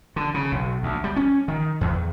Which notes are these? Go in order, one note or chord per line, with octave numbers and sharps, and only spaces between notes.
D3
C#3
B1
D2
G3
C#4
D#3
E2